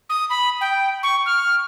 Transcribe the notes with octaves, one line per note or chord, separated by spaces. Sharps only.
D#6
B5
G5
C#6
F6